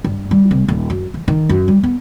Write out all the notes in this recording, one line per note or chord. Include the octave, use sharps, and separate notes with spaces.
G2
G3
C2
D#1
F#2
E3
D#3
F#2
G3
B3